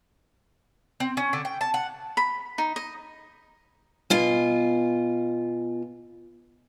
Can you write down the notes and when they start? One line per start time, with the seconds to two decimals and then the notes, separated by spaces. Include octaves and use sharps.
1.00 C4
1.17 C#4
1.33 D3
1.45 G5
1.61 A5
1.74 F#5
2.17 B5
2.58 D#4
2.76 D#5
4.10 B2 F4 G#5